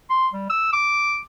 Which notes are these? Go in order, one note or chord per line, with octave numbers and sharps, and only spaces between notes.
C6
G3
E6
D6